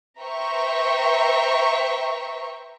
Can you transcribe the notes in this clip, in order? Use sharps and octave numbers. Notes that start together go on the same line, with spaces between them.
B4 C5 E5 G5 A#5 C#6